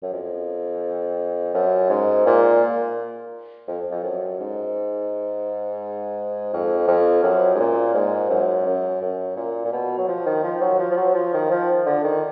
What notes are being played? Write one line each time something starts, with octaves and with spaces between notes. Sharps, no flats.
F#2
F2
F#2
G#2
A#2
F2
F2
F#2
G#2
F2
F2
F#2
G#2
A#2
G#2
F#2
F#2
F#2
A#2
A#2
B2
F#3
F3
D#3
F3
F#3
F3
F3
F#3
F3
D#3
F3
D3
D#3